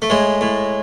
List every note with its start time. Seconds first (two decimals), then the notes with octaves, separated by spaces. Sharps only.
0.02 A3
0.10 A2 G#3
0.41 A2